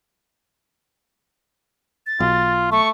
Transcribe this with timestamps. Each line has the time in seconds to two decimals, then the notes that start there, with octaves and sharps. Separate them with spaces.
2.06 A6
2.20 B1 F4
2.72 A3 C#6